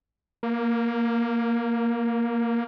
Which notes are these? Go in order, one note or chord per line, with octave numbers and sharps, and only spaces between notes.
A#3